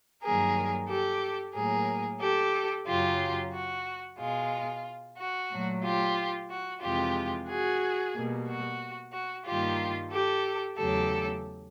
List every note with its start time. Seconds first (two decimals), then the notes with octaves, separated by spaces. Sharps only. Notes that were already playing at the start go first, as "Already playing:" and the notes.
0.23 G2 D#3 F#3 A#3 G#4 A#4
0.89 G4 A4
1.55 A2 F#3 A#3 G#4 A#4
2.21 G4 A4
2.87 F#2 C#3 F#3 F4 G4
3.53 F#4
4.19 B2 G#3 F4
5.18 F#4
5.51 A#2 F#3 A3
5.83 F4 G4
6.50 F#4
6.82 F2 C3 E3 G#3 F4 G4
7.48 F#4 G#4
8.14 B2 G3 A#3
8.47 F#4
9.13 F#4
9.46 G2 D#3 G3 A#3 F4 G4
10.12 G4 A4
10.77 E2 C#3 F#3 A3 G4 A4